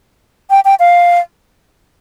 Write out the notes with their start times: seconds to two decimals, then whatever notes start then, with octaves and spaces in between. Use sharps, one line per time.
0.50 G5
0.65 G5
0.79 F5